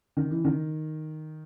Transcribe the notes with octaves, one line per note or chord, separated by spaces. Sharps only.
D#3
E3
D#3